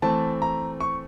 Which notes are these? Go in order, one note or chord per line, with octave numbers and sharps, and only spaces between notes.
E3 A3 C4 A5
A#5
C#6